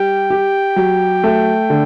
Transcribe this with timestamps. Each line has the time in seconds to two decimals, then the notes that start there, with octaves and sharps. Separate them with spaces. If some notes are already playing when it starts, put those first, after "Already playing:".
Already playing: G3 G4 G5
0.30 G4
0.76 F#3
1.23 A3
1.70 D3